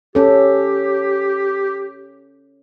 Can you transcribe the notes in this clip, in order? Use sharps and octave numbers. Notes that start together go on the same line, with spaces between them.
C#4 G4 A4